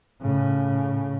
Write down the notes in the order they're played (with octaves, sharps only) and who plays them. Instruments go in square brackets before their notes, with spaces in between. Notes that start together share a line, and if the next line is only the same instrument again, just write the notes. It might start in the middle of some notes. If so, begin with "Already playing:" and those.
[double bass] A2 C#3